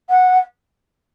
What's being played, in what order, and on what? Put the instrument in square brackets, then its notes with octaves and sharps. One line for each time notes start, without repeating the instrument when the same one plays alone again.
[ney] F#5